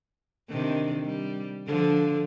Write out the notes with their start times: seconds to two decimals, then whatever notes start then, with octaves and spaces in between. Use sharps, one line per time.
0.49 C3 D#3 D4
1.05 G3
1.67 D3 F3 D4